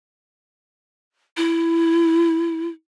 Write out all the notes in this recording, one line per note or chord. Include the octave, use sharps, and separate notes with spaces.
E4